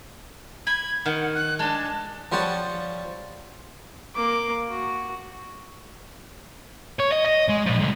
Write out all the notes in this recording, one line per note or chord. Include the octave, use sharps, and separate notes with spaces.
B5 G#6
D#3 F#5
F#6
G#3 D4 A5
F3 G3 C5 C#5 F#5 A5
A#3 D6
F#4
C#5
D#5
D#5
G#3
A#2 F3
C2 D3